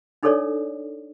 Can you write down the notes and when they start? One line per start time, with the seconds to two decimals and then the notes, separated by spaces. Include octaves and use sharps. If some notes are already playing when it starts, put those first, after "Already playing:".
0.23 D4 D#4 G#4 A4 C#5 D5